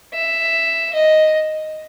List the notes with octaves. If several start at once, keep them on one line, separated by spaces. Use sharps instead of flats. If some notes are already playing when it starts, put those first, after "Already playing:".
E5
D#5